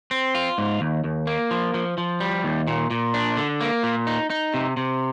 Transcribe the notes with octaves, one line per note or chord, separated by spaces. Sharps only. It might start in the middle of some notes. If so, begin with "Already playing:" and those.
C4
F4
G#2
D#2
D#2
A#3
F3
F3
F3
G3
D#2
A#2
A#2
D4
D3
A#3
A#2
D#4
D#4
C3
C3